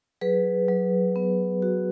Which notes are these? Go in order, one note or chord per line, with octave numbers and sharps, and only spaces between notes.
F#3 G#4 B4
F#3
B3
F#4